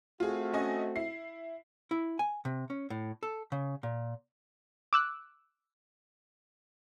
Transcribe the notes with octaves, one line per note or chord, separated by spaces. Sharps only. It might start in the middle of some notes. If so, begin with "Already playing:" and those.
A3 C4 F4 F#4 G#4
C#4 D#5 G#5
E4 C7
E4
G#5
C3
C#4
A2
A4
C#3
A#2
D6 E6 F#6